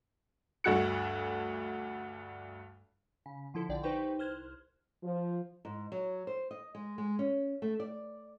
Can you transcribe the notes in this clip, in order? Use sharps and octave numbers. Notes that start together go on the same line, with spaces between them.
D2 G2 A3 F#4 F#6 C#7
C#3
D3 F3 E4 A4
A#1 D3 D5 G5
D#4 G4 B4 C5 G5 C#6
C2 C5 F6 F#6 G#6
F3
G#2
F#3
C5
D#5
G#3
G#3
C#4
A3
D5